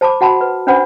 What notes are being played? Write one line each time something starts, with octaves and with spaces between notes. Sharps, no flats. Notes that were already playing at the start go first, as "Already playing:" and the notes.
C5 A5 B5 D6
F#4 F#5 A5 B5
B4
C#4 D4 B4 C5 F#5 B5